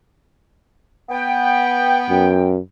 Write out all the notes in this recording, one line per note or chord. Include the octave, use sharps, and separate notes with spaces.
B3 G5
F#2